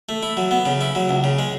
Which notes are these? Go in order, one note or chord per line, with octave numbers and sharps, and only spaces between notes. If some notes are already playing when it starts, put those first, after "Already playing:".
A3
E4
F#3
B3
C#3
E4
F#3
C#2
C#3
G#3